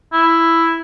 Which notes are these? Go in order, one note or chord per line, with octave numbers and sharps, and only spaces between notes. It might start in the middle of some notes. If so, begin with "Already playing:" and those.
E4